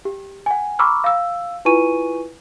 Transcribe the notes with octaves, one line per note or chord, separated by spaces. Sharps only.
G4
F#5 G#5
A#5 B5 C#6 D6 E6 F6
F5 E6
E4 F4 B4 G#5 C#6 D#7